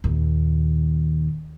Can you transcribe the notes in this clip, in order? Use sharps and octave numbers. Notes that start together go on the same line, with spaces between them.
D#2 A#2